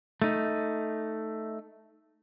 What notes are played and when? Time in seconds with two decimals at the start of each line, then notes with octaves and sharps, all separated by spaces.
0.22 A3 D#4